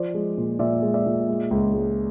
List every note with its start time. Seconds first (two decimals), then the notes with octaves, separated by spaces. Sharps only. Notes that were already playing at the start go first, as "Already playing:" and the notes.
Already playing: F3 C5 D5
0.14 G#3
0.38 A#2
0.59 A#2 D5 E5
0.82 G#3
0.94 D5 E5
1.06 A#2
1.29 G#3
1.51 C#2
1.73 G#3